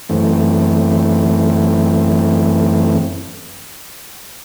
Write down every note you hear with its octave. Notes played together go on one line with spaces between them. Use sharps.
F#2 E3 A3 C4